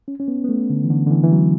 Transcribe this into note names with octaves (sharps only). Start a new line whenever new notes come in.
C#4
C#4
B3
B3
A3
D3
E3
D3
D3
E3
E3
F#3